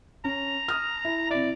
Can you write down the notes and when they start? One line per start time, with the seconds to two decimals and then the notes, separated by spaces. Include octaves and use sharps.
0.24 C#4 A#5
0.68 D#6 F6
1.05 E4
1.30 C3 E4 D5